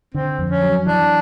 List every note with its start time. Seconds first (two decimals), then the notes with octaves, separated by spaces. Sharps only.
0.14 D3 C4
0.39 F2
0.50 C#4
0.63 F#3
0.86 E3 D4